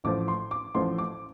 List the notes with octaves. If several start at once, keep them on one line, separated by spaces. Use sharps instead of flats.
A1 A2 F3 D6
C6
D6
A1 A2 F3 C6
D6